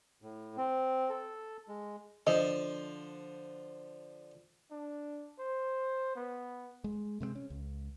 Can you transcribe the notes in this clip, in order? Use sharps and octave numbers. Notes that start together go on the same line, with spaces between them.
A2
C4
A4
G#3
D3 F3 D#5
D4
C5
B3
G#3
C3 G#3 A3 C4
C#4
C#2